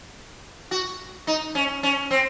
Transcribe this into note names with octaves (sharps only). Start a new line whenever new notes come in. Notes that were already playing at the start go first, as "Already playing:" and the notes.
F#4
D#4
C#4
C#4
C4